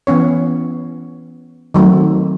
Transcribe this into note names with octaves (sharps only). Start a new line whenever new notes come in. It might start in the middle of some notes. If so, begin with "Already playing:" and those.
E3 B3 C#4 C#5
D#3 F#3 A3 C4